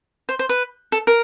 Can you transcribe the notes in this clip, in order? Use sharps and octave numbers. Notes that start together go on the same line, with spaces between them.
C5
C5
B4
A4
A#4